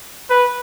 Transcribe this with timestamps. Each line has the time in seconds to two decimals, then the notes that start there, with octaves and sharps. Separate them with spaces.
0.30 B4